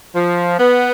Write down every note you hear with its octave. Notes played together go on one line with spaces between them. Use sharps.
F3
B3